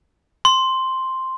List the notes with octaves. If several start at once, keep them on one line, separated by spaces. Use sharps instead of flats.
C6